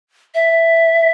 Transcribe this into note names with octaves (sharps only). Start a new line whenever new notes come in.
E5